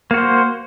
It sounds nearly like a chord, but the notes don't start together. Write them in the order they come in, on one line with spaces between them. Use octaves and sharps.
A#3 F#4 C5